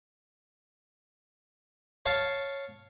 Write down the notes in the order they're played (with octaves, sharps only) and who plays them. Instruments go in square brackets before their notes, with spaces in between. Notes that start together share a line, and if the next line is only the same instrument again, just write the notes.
[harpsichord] C#5 F5 A5